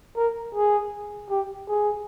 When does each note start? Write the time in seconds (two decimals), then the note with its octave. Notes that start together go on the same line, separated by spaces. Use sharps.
0.17 A#4
0.55 G#4
1.30 G4
1.68 G#4